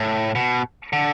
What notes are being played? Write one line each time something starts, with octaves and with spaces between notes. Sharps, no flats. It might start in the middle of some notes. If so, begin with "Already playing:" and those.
Already playing: A2
B2
D3